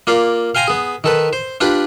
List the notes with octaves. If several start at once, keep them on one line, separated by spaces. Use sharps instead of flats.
A#3 F4 D5 F5
F5 G5 G#5 A#5 C6
B3 G#4
D#3 A4 B4
C5
D4 F4 G4 B4 D5